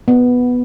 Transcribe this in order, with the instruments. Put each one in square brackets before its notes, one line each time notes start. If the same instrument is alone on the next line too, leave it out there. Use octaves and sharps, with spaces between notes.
[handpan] B3